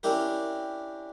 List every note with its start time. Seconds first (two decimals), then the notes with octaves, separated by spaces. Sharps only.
0.03 C#4 D4 E4 G4 A#4